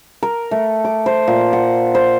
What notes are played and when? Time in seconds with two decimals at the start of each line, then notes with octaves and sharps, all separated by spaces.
0.23 A#4
0.51 A3
0.85 D6
1.06 C5
1.27 A#2
1.53 F#5
1.95 C5